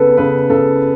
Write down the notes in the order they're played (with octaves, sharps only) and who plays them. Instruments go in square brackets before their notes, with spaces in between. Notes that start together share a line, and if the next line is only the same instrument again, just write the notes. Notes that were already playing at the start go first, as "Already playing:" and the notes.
Already playing: [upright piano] C#3 B3 A4 B4
C#3 B4
C#3 A4